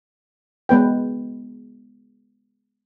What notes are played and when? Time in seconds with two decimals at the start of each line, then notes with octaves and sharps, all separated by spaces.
0.69 G#3 B3 B4 G5